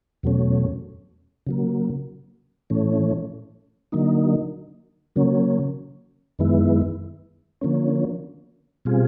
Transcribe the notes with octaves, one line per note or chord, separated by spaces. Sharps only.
E2 B2 F#3 A3 C#4
C#3 F#3 A#3
A2 E3 A3 C#4
D3 F#3 A#3 D#4
C#3 F#3 A#3 C#4
F#2 D#3 G#3 B3 E4
D3 F3 A#3 C#4
B2 G3 C4 F4 G#4